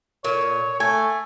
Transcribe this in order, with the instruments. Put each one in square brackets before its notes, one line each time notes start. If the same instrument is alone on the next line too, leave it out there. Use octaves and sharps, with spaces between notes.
[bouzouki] A#2 [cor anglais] C#5
[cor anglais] A3 [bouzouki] G#5